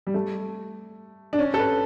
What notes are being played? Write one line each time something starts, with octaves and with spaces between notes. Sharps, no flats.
G3
A3
D4
C#4
A4
B4